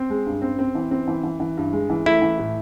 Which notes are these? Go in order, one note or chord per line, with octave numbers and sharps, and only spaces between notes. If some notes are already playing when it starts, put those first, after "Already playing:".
Already playing: C4
G#3
G2
C4
C4
E3
C4
E3
E3
E3
G2
G#3
E3
A3 E4
E3
A2